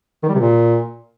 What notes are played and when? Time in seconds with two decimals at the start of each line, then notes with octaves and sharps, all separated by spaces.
0.23 D#3
0.29 G3
0.34 C3
0.40 A#2